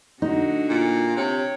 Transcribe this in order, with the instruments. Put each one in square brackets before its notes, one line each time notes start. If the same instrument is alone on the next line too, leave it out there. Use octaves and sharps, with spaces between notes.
[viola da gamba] D3 F#4 [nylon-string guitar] D#4
[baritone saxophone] A#2
[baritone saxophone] C3 [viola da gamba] C#5